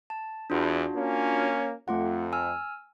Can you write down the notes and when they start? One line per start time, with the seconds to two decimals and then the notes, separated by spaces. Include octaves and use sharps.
0.10 A5
0.50 E2 D4 F4 F#4
0.94 A#3 C#4
1.88 F2 A3 F4 F#5
2.33 G#5 E6 F6